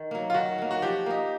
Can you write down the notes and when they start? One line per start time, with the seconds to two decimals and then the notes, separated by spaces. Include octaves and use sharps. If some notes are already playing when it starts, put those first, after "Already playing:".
Already playing: D#3
0.11 F#3 A#3
0.30 F4
0.34 D#3 F#4
0.58 F#3 A#3
0.71 F#4
0.82 F3 G4
1.06 A#3 D#4